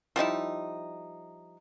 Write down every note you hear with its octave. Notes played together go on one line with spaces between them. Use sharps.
F3 G3 D#4 E4